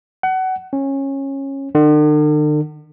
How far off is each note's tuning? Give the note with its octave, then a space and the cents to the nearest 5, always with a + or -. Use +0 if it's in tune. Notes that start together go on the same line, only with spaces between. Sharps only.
F#5 +25
C#4 -20
D3 +45